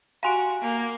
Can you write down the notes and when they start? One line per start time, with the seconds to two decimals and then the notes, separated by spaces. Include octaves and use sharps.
0.23 F#4 G4 F5 G#5 A#5 C6 D7
0.62 A#3